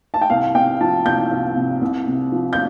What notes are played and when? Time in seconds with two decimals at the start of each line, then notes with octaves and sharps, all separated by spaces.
0.14 A5
0.21 G5
0.30 C2 F5
0.55 C3 G5
0.81 F3 A5
1.05 C2 G6
1.31 C2
1.56 C3
1.81 C2
2.07 C3
2.32 F3
2.53 G6